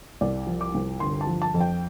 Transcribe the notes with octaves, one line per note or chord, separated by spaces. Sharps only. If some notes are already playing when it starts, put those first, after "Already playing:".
C2 D5
F3
D6
C2
G1 C6
A5
F3
A5
F2
G5